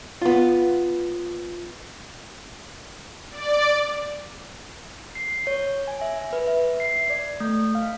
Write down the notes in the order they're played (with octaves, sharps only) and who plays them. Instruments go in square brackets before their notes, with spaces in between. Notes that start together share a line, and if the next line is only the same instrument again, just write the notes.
[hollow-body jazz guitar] B3 F4
[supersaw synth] D5
[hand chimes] C7
C#5
G#5
E5
B4
E5
C7
D5
A3
F5